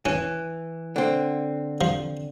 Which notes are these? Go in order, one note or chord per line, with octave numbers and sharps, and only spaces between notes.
E3 C#4
D3 C4
F3